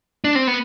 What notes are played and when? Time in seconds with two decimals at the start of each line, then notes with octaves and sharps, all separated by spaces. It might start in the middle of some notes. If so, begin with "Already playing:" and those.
0.24 D4
0.35 C4
0.47 B3